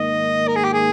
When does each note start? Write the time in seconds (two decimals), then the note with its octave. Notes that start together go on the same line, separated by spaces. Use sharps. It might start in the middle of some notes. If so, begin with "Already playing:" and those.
Already playing: G#2 D#3 A#3 D#5
0.48 A#4
0.56 G#4
0.64 G4
0.73 G#4